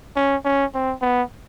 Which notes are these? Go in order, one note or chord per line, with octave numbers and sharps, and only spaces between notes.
C#4
C#4
C4
B3